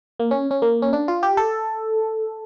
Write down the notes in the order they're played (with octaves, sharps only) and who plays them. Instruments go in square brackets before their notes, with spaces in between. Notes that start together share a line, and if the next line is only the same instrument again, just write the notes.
[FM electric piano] A#3
C#4
C#4
A#3
C#4
D4
F4
G4
A4